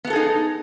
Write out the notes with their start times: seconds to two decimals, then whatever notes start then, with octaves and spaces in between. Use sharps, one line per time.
0.05 B3
0.07 A3
0.10 A4
0.13 G#4
0.16 D#4